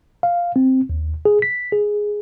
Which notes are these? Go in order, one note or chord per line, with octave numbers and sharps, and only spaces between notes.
F5
C4
D#2
G#4
B6
G#4